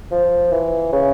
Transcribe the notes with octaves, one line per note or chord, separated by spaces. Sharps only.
F3
E3
C#3